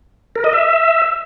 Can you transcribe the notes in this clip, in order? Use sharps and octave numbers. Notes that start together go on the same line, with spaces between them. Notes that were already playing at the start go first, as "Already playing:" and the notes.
A#4
D#5
E5